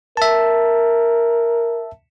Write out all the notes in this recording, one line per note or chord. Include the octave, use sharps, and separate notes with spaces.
A#4 E5 A5